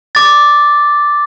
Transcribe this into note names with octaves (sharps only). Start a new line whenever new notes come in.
D6 A6